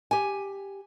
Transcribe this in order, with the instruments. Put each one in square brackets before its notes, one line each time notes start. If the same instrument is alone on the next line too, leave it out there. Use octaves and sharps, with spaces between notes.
[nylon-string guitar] G4 G#5